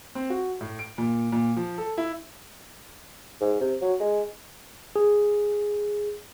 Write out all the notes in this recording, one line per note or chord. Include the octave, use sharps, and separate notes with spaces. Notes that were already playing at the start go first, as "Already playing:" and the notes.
C4
F#4
A2
D7
A#2
A#2
F3
A4
E4
G#2
C3
F#3
G#3
G#4